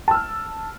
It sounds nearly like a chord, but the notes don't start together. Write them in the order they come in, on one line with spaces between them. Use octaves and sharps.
A5 E6 F6